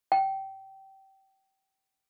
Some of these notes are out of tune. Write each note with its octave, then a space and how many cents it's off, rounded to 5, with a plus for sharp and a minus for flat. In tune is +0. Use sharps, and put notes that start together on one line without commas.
G5 -20